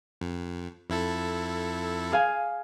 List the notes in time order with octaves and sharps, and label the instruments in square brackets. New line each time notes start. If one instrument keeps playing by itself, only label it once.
[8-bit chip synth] F2
F2 E4 A4
[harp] G#4 F5 G#5